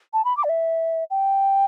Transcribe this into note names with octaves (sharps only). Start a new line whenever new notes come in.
A5
B5
D6
D5
E5
G5